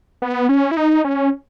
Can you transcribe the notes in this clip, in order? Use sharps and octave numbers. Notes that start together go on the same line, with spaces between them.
B3
C#4
E4
D#4
C#4